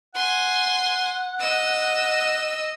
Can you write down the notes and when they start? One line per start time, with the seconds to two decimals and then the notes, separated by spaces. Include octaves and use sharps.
0.15 F#5 G#5 C6
1.40 D#5 E6